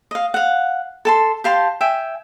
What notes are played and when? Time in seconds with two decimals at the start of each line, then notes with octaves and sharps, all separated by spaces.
0.11 D#5 F5
0.34 F5 F#5
1.05 A4 A5 C6
1.44 G4 F5 A5 C6
1.81 E5 G5 G#5